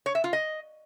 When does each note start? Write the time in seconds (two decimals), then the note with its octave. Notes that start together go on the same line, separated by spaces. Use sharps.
0.06 C#5
0.15 E5
0.24 F4
0.33 D#5